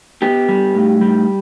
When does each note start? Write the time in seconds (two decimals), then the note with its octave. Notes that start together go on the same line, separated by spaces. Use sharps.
0.22 B3 G4
0.48 G3
0.74 A2
1.01 G3